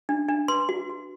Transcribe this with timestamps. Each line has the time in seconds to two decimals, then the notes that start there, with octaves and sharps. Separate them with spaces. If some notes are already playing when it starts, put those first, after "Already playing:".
0.09 D4
0.29 D4
0.48 B4 C6
0.69 F#4
0.90 F#4